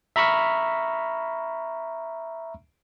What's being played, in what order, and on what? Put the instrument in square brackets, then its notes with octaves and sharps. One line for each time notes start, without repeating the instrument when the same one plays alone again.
[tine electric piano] E5 A#5 B5 C#6 E6 F6